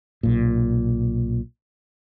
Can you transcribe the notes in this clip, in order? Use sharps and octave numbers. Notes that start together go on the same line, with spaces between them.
B1 A#2